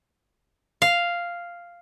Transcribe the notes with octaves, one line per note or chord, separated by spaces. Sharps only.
F5